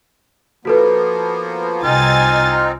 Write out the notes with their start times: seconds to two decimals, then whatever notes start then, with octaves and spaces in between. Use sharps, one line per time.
0.65 F3 A#3 B3 F#4 A4 B4
1.83 C2 C4 D#4 F4 G#5 A6